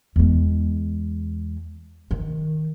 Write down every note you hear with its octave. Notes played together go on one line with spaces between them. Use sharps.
E2 G#3
D#3